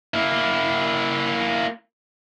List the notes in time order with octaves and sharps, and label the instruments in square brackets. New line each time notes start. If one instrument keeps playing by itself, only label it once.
[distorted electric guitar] A#3 E4